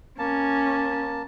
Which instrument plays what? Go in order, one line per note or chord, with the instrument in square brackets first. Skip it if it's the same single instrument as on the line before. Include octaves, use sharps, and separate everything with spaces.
[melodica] A#3 A5 [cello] C#4